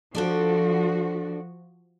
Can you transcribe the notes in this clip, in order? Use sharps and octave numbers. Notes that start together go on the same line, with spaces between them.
F3 D4 F#4 A4 D5